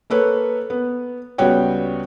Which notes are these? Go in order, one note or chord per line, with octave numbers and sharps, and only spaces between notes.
A#3 A4 B4 C#5
B3
C#2 G3 B3 F#4 C#5 G5